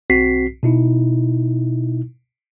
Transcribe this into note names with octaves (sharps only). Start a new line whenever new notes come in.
B1 C4 F#4 B6 C7
B2 D#4 E4